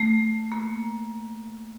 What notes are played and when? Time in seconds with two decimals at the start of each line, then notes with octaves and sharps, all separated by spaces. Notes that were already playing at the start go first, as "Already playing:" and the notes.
Already playing: A3
0.52 A#3